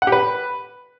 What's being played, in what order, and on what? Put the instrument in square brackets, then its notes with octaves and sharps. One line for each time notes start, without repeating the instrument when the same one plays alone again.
[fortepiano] F#5
G4
B4